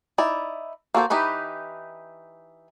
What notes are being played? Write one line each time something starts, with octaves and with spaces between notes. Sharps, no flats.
D#4 E4 D5
A#3 F#4 A4 C5
E3 D#4 G4 B4 B5